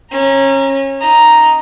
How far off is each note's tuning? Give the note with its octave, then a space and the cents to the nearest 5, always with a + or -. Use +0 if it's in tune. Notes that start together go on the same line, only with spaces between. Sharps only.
C#4 -25 A#5 +0
D#4 +0 A#5 +0